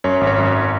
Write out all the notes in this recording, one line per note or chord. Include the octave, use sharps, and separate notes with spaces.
F#2 C#5
G#1
C#5
F#2